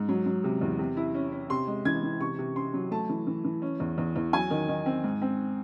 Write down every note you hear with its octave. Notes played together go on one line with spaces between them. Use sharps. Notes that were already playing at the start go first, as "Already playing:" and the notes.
Already playing: G#2
F#3
F#3
C3
E2
C3
E4
C#4
C#4
C3 C6
G#3
E3 G#6
E3
C3 C#6
C3
C4 C6
F#3
A3 A5
E3
E3
E3
C#4
E2
E2
E2
F#3 G#5
D#3
D#3
C4
G#2
C4